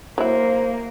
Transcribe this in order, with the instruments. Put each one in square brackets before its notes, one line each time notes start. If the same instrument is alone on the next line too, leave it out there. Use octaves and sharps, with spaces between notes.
[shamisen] F#3 E4 [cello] A#3 [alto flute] C5